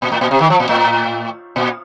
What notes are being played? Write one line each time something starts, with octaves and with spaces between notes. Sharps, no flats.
A#2
A2
A#2
C3
D#3
F3
A#2
A2
A#2